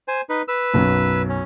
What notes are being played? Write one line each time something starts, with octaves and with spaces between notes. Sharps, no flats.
C5 G#5
D#4 B4
B4 E6
B1 F#2 F#3
C#4